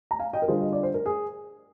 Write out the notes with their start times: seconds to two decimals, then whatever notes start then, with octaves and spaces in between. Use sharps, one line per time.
0.11 A#5
0.19 F5 G#5
0.33 D#5 G5
0.42 A#4
0.48 D3 G3 D4 F4 G#4 C5
0.61 D#5
0.73 D5
0.83 C5
0.94 A#4
1.06 G#4